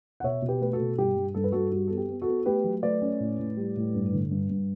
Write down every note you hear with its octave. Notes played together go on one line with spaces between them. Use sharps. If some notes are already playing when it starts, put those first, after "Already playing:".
F#5
B2 C#5 E5
B2
G4 B4
A3 B4
F#4 A4
B2
G2 G4
G2
G2 A4
B4
G2 F#4 A4
G3 F#4
B3 A4
G4
B3
F#4 A4
B3
A3 G4 B4
F#3
A3 B4 D5
C#4
A2
A2
G3
A2
G2
D3
G2
G2